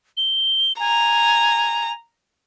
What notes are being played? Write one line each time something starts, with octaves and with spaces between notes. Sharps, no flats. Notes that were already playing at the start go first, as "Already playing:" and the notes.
G7
G#5 A#5